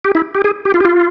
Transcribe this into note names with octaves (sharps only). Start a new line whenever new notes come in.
G4
E4
G4
G#4
G4
F4
G4
F4